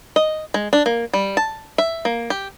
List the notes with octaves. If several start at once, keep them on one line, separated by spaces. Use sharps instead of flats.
D#5
G#3
D4
A#3
G3
A5
E5
A#3
G4